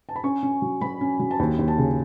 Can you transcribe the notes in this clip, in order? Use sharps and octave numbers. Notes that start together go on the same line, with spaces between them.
A5
B5
C#4 C#6
C#4
F#3
F#3 B5
C#4
F#3
A5
D#2 B5
D#2
A5
C#3